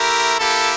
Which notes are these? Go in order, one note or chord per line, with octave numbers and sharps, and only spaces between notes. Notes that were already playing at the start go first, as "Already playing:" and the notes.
Already playing: A3 E4 G4 A#4
A#3 E4 G4 A4